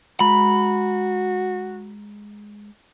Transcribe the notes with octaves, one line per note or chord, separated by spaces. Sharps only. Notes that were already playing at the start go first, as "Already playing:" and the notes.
G#3 F#4 A#5 B5